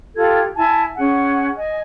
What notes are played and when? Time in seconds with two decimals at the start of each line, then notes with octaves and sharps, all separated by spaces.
0.16 F4 G4 A4 G#6
0.56 E4 G#5 A5
0.97 C#4 G#4 F#5 G#5
1.57 D#5 G#5